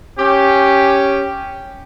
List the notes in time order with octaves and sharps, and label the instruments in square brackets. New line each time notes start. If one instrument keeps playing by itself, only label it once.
[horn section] C#4 G4